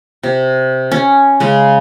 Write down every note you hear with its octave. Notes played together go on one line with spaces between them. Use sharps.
C3
C#4
C#3 G#3